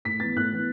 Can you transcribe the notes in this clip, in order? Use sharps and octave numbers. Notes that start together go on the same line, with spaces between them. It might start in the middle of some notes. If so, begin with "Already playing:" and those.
A2 B6
E3 B3 A6
A2 F#6
E3 B3